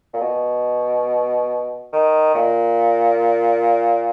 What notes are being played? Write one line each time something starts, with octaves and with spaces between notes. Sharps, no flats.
A#2
B2
D#3
A#2